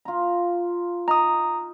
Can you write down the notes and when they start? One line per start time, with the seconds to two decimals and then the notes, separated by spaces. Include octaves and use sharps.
0.05 F4 A#5
1.08 D#4 A#5 D#6